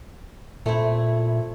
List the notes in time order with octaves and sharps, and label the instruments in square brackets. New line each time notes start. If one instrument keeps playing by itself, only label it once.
[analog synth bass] A#2 [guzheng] A3 C4 E4